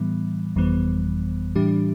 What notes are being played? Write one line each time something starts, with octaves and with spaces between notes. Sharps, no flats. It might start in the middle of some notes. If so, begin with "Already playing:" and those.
Already playing: A2 E3 G3 B3
G1 F2 E3 G3 B3
A2 E3 G3 D4 G4